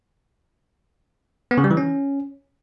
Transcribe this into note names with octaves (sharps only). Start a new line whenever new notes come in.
B3
C#3
G3
E3
C#4